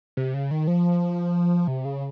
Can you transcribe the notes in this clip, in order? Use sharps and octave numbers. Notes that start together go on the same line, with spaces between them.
C3
C#3
D#3
F3
C3
C#3